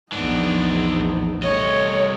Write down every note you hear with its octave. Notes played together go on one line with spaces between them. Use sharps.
A#1 E2 E3 B3 D4 D#4
C2 A3 C#5 D#5